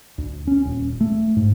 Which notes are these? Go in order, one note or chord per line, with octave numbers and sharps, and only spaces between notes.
D2
C#4
D#1
A3
G#2